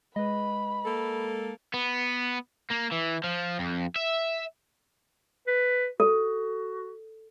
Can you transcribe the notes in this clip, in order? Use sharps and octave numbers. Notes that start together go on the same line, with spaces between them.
G#3 B4 D#5 B5
A#3 A4
B3
A#3
E3
F3
F2
E5
B4
F#4 A4